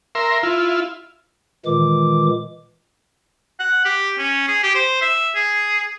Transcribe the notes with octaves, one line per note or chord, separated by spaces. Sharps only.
A#4 E5 C6
E4 F4
A#2 D#3 E3 G#3 D6
F#5
G4
C#4
G#4
G4
C5
E5
G#4